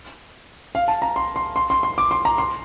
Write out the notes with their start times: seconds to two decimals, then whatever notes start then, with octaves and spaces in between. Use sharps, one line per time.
0.75 F5
0.88 A5
1.02 A#5
1.16 C6
1.36 C6
1.56 C6
1.70 C6
1.83 C6
1.98 D6
2.11 C6
2.25 A#5
2.38 C6